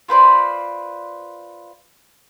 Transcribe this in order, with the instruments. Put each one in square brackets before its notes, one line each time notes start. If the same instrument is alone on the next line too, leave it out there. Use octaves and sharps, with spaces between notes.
[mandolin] F4 B4 C5 D5